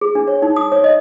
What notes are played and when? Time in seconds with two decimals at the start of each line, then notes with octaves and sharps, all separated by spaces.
0.01 G#4
0.15 D4
0.28 C#5
0.42 D#4
0.56 D#6
0.72 C#5
0.84 D#5